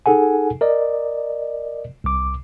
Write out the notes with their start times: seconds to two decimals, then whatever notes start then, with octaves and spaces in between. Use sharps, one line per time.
0.06 D#4 G#4 A4 F#5 G#5
0.61 A#4 D5 D#5
2.04 C2 D6